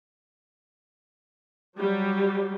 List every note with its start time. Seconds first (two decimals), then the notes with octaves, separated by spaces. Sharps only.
1.79 F#3 G3